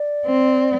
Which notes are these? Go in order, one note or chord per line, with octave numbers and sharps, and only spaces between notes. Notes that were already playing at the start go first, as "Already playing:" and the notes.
Already playing: D5
C4